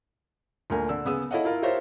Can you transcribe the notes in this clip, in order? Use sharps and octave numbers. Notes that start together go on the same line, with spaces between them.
D2 A#2 A#4 G#5
D3 E6
C#3 B3 G#4 D#6 E6
E4 A4 C#5 D#5 F5 F#5
E4 F4 A#4
F4 G4 A#4 C5 C#5 E5